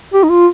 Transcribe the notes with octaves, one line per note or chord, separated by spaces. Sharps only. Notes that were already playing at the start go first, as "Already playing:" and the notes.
G4
D#4
F4